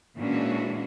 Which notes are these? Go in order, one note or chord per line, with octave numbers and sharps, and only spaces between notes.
A#2 E3 G#3 C#4 D4 F#4